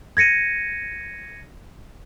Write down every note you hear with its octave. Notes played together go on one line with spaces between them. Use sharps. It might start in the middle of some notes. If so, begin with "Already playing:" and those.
G#6 A#6 C#7 D#7